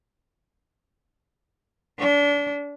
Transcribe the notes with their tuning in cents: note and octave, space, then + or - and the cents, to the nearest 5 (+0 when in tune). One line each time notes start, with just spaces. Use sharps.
D4 -30